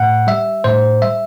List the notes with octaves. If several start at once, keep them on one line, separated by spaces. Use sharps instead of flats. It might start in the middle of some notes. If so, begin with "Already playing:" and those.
Already playing: A2 F#5
G3 E5
A2 C5
G3 E5